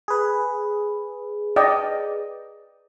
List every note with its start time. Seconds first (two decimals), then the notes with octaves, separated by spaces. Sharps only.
0.08 G#4 B4
1.56 D5 D#5 G5